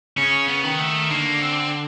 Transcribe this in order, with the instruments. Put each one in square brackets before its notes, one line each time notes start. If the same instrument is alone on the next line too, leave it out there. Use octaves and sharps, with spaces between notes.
[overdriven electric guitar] C#3 [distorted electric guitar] C#4
[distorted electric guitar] B3
[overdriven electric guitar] D#3
[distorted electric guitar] A3
[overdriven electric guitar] D3 [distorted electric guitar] A#3
[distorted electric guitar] C4